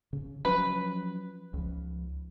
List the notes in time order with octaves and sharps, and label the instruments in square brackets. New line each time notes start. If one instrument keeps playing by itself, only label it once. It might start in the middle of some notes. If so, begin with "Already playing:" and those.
[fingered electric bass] C#3
[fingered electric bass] F3 F#3 C#4 [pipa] B4
[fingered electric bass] C#2 F3